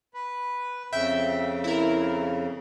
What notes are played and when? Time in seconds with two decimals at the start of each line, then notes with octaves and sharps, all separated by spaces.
0.14 B4
0.93 F2 C#3 E5 G5
1.64 E4 A#4